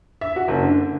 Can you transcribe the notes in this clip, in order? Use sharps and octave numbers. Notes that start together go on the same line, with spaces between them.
E5
F#4
F#1
D3